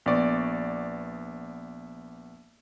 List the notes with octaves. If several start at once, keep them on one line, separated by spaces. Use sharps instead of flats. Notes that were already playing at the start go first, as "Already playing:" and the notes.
A#1 B3 D5 C#6